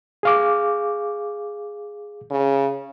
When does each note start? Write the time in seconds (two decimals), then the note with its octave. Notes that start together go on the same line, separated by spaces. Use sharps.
0.23 G#4 F5 D6
2.30 C#3